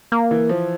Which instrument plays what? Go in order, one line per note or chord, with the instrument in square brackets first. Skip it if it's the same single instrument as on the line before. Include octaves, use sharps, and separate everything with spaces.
[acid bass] A#3
[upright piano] E3
F3